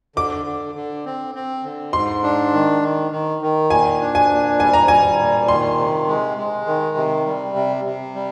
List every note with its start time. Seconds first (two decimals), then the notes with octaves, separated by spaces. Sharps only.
0.16 D3 D6
0.45 D3
0.75 D3
1.06 C4
1.35 C4
1.64 D3
1.93 G#2 C6
2.23 D4
2.53 D#3
2.82 D#3
3.11 D#3
3.42 D#3
3.70 A#2 G#5
4.01 D4
4.15 G#5
4.30 A#2
4.60 G3 G#5
4.73 A#5
4.88 G3 G#5
5.19 A#2
5.48 D#3 C6
5.78 C3
6.08 G#3
6.38 G#3
6.67 D#3
6.97 C3
7.26 G3
7.55 C3
7.85 C3
8.15 G3